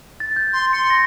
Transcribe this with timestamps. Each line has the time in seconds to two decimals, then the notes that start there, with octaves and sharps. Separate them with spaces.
0.20 A6
0.36 G6
0.53 C6
0.73 C6 C#7
0.90 A#6